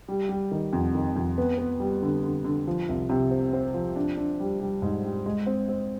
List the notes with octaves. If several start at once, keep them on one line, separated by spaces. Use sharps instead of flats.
G3
G3
D#3
F2
D#3
F2
B3
B3
G3
D3
D3
D3
F3
C2
C3
C4
C4
F3
D4
D4
G3
G3
G#2
G3
G#3
C4
C4